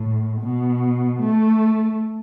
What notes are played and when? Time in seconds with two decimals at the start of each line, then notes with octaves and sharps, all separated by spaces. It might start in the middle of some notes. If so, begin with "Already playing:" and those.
Already playing: A2
0.41 B2
1.20 A3